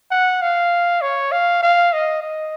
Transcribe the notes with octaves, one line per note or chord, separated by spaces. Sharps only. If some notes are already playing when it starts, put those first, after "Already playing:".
F#5
F5
C#5
F5
F5
D#5
D#5